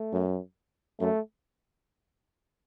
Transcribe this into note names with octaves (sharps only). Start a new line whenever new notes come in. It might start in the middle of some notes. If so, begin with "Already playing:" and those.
Already playing: A3
F#2
F#2 A3